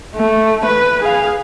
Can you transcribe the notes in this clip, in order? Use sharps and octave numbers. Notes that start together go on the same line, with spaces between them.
A3
B4
G#4 F5